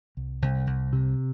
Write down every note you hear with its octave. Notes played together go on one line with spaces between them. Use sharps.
C2
C2
C2
C3